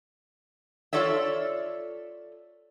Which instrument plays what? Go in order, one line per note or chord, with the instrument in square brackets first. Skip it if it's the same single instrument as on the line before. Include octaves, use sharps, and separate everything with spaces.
[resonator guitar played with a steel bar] F4 A4 C#5 D5 E5